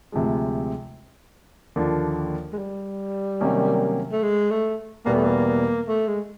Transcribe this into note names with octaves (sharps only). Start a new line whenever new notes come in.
D2 C3 F3 G#3
D#2 D3 F3 A#3 D4
G#3
G3
C3 D#3 F#3 A#3 C#4
A3
G#3
A3
E2 B2 G3 A#3 B3
A3
A#3
A3
G#3